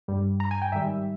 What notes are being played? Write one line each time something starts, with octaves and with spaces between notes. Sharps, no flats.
G2 G3
A#5
G#5
G5
G#2 D#3 G3 E5